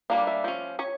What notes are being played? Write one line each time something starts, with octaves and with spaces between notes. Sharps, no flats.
G3 A#3 D4 F5
E5
F3 C#4
C#4 C#5